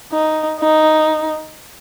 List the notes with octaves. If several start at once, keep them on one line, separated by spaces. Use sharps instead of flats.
D#4
D#4